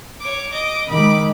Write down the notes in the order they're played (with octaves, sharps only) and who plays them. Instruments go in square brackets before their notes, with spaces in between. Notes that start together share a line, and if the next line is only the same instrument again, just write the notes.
[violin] C#5 D6
D#5 D6
[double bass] D#3 G#3 [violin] B5 D6